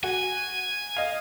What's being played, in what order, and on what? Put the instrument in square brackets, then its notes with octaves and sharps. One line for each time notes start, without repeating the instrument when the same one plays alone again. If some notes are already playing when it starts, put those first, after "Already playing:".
[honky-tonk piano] F#4 [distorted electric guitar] G#5
[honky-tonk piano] D#5 F5